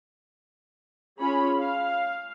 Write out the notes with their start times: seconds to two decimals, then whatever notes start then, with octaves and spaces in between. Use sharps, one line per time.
1.19 C#4 F4 G#4 C#5 B5
1.58 F5